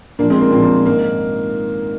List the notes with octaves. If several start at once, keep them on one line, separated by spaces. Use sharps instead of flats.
A#2 F3 A#3 D4
G#3 C4
A#3
A#2 F3 C4
A#3
G#2 D#3 A#3